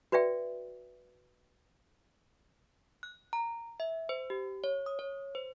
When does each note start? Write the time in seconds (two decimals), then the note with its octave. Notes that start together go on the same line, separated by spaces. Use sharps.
0.12 F#4 B4 D5 E5 G5
3.03 F#6
3.33 A#5
3.80 E5
4.09 C5
4.30 G4
4.64 C#5
4.86 D#6
4.99 C#5
5.35 C5